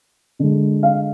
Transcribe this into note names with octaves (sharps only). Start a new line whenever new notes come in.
D3 G#3
F5